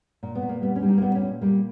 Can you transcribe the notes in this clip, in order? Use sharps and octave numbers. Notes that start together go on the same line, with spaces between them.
A#2
B3
A#2
A#3
G3 B3
C#4
G3
D#4
A#3
A#2 B3
C#4
A#2
G3 A#3